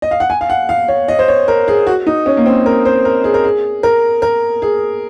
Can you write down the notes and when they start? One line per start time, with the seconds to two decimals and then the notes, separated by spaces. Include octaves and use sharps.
0.02 D#5
0.11 F5
0.20 F#5
0.30 G#5
0.41 F5
0.50 F#5
0.69 F5
0.88 C#5
1.08 D#5
1.19 C5
1.28 C#5
1.48 A#4
1.68 G#4
1.87 F#4
2.07 D#4
2.26 C#4
2.37 A#3
2.46 C4
2.66 A#4
2.85 C5
3.05 A#4
3.24 G#4
3.34 A#4
3.44 G#4
3.83 A#4
4.22 A#4
4.62 G#4